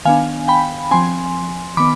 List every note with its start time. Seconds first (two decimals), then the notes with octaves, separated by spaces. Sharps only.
0.05 D#3 B3 D4 F5 G#5
0.48 G5 B5
0.91 F3 C4 G#5 C6
1.77 D#3 B3 B5 D6